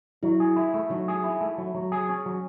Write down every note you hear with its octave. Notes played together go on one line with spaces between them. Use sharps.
F#3 E4
G#4
E4
A3
F#3 D#4
G#4
E4
A3
F#3
F#3
G#4
C#4
F#3